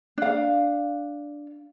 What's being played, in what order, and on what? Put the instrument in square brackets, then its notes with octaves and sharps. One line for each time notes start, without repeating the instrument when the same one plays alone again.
[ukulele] D4 F5